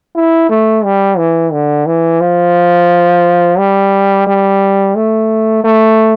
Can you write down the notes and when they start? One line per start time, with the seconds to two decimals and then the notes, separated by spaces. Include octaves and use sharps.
0.16 E4
0.49 A3
0.84 G3
1.18 E3
1.53 D3
1.86 E3
2.21 F3
3.58 G3
4.27 G3
4.95 A3
5.64 A3